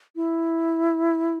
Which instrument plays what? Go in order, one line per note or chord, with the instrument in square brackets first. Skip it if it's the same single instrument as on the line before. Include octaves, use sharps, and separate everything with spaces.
[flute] E4